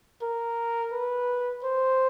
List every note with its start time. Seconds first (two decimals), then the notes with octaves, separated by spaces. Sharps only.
0.22 A#4
0.92 B4
1.63 C5